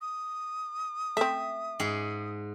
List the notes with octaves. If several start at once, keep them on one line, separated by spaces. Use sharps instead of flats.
D#6
A3 C4 E5
G#2 G#4